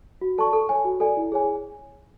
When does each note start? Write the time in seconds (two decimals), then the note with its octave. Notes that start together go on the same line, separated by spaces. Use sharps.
0.21 F#4
0.38 A4 D5 A5 C#6
0.53 A4
0.69 C#5 G#5
0.85 F#4
1.00 A4 D5 G#5
1.17 E4
1.32 G#4 C#5 G#5